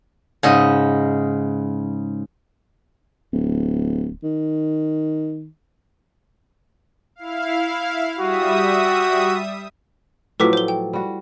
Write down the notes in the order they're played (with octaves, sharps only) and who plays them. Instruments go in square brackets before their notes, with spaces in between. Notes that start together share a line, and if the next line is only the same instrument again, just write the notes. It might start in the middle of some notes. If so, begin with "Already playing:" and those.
[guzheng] G#2 C#3 D#5
[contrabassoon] D1
D#3
[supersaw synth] E4 F5
[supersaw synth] G3 E5 D#6 [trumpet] F#4
[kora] A2 F3 F#3 [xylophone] B4 D6 B6
[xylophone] C5 G7
G5
[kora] G3 F#4